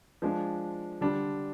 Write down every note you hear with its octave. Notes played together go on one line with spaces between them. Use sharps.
F3 G#3 D4
D3 G3 D4